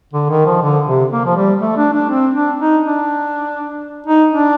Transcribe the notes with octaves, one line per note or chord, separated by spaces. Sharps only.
D3
D#3
F3
D3
C3
A#3
F3
G3
A3
D4
D4
C4
D4
D#4
D4
D#4
D4